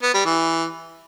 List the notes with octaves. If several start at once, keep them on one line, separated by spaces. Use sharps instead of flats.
B3
G3
E3